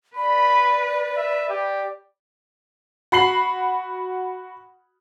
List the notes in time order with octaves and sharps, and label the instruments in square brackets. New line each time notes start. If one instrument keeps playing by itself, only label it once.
[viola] B4 [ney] D5 [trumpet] B5
[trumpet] E5
G4
[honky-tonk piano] F#4 B5 C7 F#7